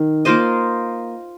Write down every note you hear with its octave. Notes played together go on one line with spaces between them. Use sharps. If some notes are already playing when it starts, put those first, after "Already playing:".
Already playing: D#3
A#3 F4 C5 D#5